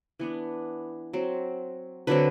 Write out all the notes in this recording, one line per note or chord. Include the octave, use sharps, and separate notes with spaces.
E3 B3 D4
F#3 C4
D3 F#3 C4 B4